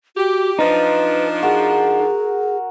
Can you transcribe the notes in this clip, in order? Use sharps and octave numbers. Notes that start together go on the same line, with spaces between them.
F#4 G4
F3 D4 D#4 B4
F#4 G#4 A#4